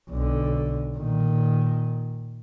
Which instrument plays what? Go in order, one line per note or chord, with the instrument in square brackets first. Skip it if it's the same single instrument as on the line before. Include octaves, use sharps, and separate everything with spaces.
[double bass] B1 D3
A#2 D#3